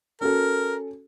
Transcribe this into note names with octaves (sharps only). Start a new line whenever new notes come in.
C#4 F#4 A4 A#4